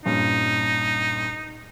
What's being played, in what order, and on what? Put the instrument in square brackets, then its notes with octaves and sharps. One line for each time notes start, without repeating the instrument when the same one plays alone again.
[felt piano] G2 A#2 C#4 [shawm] D#4